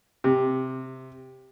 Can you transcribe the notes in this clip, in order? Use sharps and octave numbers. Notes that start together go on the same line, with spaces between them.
C3